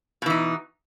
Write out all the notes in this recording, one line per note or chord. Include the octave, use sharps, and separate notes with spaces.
B2 E3 D#4